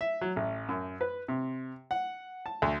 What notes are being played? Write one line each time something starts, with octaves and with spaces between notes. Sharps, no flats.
E5
F#3
A1
F#2
B4
C3
F#5
A5
D2